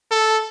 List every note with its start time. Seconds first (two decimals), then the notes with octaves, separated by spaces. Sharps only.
0.11 A4